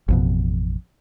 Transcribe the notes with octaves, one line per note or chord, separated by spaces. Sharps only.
A1 F2 B2